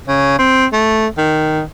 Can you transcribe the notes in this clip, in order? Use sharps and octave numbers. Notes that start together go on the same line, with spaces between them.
C#3
C4
A3
D#3